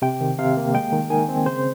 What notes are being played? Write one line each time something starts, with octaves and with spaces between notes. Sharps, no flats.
C3 G5
D#3
C3 F5
A#3
G#3 G5
D#3
D#3 G#5
C4
C#3 C5